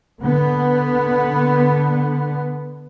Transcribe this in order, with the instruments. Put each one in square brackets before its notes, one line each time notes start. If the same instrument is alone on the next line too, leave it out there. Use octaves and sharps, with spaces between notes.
[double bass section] D3 B3